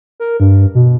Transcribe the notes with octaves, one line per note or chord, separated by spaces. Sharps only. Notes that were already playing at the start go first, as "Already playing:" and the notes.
A#4
G2
B2